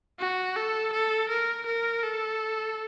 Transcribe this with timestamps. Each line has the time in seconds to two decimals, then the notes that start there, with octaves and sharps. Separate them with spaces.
0.19 F#4
0.56 A4
0.93 A4
1.29 A#4
1.66 A#4
2.03 A4